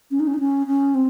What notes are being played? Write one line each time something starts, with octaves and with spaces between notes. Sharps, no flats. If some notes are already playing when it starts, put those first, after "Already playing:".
C#4
D#4
C#4
D#4
C#4
C#4
C4